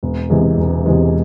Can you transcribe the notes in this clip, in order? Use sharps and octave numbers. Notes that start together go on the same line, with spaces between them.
E1
E2 C3 E3 G#3
E1
E2 C3 E3 G#3